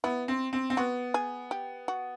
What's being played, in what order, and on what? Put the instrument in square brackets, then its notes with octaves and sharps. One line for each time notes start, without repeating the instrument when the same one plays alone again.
[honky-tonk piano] B3 [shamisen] E4
[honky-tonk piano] C4
C4
C4
[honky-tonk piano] B3 [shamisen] F#4
[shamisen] G#4
G4
F#4